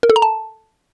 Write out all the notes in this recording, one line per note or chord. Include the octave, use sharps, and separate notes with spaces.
A#4
A4
A#5
A5